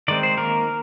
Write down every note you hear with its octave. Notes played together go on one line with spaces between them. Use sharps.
D#3 G#3 C4 D5
C5
D#3 A#3 A#4